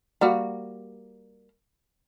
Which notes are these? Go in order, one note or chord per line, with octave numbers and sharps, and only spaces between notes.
G3 A#3 F#4